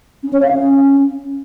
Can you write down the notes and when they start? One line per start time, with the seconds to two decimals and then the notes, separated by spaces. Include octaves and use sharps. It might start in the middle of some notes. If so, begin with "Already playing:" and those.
0.23 C#4
0.33 C#5
0.43 F5
0.52 C#4